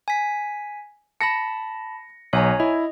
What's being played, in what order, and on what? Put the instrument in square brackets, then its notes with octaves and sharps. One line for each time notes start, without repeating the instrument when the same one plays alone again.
[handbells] G#5 B6
[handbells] A5 B5 [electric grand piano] A#6 C#7
[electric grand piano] B1 [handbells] C#5 G#5 A#5
[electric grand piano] E4 [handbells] D#5